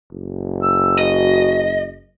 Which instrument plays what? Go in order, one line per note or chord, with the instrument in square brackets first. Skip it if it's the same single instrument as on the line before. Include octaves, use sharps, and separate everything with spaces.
[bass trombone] F#1
[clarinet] E6
[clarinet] F#4 [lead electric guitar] D#5